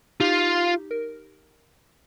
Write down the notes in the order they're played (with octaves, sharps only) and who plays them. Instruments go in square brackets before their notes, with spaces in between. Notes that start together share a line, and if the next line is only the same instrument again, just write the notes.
[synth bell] D#4 G4 [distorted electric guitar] F4
[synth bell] A#4